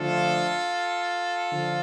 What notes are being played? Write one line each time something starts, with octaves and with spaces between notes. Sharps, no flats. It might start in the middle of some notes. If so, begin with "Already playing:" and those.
Already playing: D3 F3 A3 D4 F4 A4
D3 F3